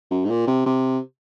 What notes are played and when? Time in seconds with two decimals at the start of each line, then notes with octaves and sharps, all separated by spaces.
0.11 F#2
0.25 G#2
0.30 A#2
0.47 C3
0.67 C3